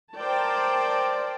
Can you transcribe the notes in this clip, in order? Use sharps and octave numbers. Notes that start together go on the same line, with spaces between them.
A#4 C5 D5 G5 A5